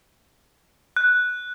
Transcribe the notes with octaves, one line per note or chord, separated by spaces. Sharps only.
F#6